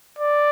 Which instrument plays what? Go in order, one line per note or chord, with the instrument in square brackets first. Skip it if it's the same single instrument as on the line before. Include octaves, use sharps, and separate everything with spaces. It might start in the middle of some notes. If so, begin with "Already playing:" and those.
[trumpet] D5